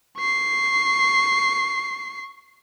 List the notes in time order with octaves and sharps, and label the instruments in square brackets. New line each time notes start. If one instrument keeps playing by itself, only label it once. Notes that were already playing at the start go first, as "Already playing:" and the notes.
[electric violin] C#6 C7